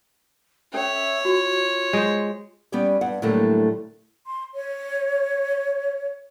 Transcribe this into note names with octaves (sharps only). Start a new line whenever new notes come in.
C#4 A4 C#5 E5 G5
F4 F#4
G#3 C5
G3 B3 C#4 G4 C#5 D5
G2 F#5
A2 D3 F#3 G3 A3 A#3
C6
C#5